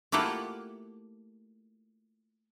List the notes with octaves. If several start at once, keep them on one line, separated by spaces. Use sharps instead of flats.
A3 A#3 E4 F4 G4 F#5